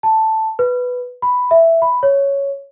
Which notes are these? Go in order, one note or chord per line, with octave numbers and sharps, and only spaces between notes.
A5
B4
B5
E5
B5
C#5